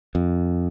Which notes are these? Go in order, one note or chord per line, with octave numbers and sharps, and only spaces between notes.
F2